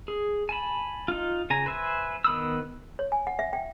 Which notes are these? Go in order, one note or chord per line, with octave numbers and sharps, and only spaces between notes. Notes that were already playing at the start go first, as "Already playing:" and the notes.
G#4
G#5 A5 B5
D#4 F4
C#3 G#5 A#5
B4 C5 E5 G#5
D#3 B3 B5 D#6 E6
C#5
G#5
F#5
E5
G5